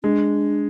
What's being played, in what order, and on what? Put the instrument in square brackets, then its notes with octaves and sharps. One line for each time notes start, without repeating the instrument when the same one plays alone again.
[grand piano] G#3 [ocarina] D4